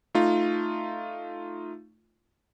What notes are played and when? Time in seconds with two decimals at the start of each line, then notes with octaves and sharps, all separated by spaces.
0.15 A3 D#4 F4